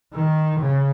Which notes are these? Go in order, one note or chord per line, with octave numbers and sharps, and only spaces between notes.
D#3
C#3